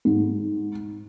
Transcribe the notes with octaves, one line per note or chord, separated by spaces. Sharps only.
G#2